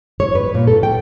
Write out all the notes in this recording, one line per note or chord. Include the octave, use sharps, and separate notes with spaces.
C#5
B4
A#2
A4
G5